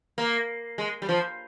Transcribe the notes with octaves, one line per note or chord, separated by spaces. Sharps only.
A#3
G#3
G3
F3